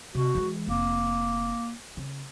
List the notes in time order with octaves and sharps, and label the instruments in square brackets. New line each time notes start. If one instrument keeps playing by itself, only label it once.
[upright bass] C3 [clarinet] F#4
[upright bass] E3 G#3
[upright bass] F1 [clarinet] A#3
[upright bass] C#3